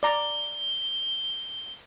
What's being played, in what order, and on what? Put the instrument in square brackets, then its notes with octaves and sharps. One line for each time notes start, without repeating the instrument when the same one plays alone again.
[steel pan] D5 A#5 [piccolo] G7